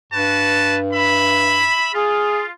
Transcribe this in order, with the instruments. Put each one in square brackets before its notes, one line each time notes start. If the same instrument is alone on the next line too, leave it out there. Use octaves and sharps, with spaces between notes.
[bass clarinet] G2 [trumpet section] F#4 B4 A5
[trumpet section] E5 B5
[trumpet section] F4 [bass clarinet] G#4